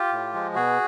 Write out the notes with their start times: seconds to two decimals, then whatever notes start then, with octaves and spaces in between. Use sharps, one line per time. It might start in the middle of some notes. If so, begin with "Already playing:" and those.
Already playing: F4 G4
0.12 A2
0.34 F3 G#3
0.55 B2 F#4 G#4